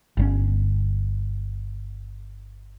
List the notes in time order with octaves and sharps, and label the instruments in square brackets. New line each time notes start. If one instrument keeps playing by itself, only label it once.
[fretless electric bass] G1 D3 C#4